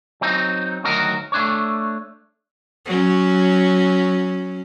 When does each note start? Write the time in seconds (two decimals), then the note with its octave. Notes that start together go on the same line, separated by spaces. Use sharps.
0.21 F#3 C4 D#4
0.84 D2 D#3 F#3 F#4 A#4 D#5
1.32 A3 D4 C#5
2.86 F#3 C#4